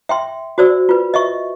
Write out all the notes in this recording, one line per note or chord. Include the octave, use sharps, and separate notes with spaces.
E5 G5 C6
F#4 C5 D5 E6
F4 B4
D#5 E5 C#6